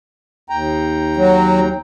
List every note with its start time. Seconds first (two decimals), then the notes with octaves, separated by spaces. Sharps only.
0.50 D#2 G5 A#5
1.17 F#3